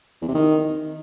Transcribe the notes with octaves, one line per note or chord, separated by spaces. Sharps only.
E2
C3
D#3